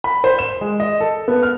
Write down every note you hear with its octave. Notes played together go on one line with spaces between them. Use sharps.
B5
C5
E7
G#3
D#5
A4
B3
F6